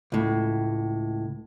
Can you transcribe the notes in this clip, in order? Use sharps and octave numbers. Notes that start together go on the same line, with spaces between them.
C#2 A2